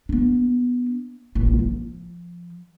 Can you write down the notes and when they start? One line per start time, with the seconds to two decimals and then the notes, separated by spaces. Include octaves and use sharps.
0.09 B3 D4
1.35 D#1 A1
1.59 F3